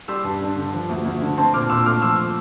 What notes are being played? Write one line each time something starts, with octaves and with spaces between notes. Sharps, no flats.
G3 C6 E6
G2
D4
D3
F3
D2
D2
D3
C4 A5 C6
A#2 D6 F6
A#2 C6 E6
A3 D6 F6
F3 C6 E6